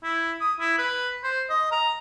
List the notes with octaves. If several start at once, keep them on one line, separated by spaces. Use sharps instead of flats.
E4
D#6
E4
B4
C5
D#5
A#5